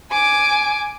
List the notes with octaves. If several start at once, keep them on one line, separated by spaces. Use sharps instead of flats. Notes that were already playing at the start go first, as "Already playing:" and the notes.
G#5 D6